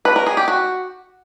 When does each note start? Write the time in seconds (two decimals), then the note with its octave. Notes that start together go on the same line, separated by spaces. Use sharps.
0.05 B4
0.16 A#4
0.26 G#4
0.37 G4
0.48 F#4